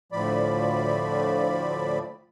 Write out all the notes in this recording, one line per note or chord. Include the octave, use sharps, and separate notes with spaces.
D2 A2 F3 D5 B5